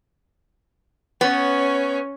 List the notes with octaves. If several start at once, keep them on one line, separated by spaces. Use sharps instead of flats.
B3 C#4 C#5